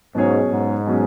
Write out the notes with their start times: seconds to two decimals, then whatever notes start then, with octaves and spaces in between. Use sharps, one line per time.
0.15 G#2 B2 F#3 C#4 G#4 C#5
0.51 G#2
0.87 B2 F#3 C#4 G#4